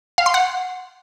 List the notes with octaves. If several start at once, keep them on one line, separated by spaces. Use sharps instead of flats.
F5
C6
F#5